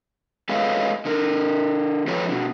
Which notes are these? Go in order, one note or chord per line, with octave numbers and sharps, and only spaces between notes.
G#3 A4 B4 C#5 D#5 F5
D3 A#4
F3 C#4 G4 A4 B4 C#5
B2 D3